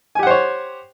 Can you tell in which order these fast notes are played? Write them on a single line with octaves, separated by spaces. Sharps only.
G#5 G4 F#5 C5 C#5